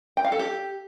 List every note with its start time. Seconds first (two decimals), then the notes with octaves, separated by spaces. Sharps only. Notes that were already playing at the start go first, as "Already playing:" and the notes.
0.17 G5
0.24 F5
0.32 A4
0.39 G4